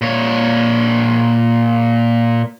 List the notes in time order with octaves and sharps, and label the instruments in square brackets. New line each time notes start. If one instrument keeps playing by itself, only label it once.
[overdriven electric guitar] A#2 C#5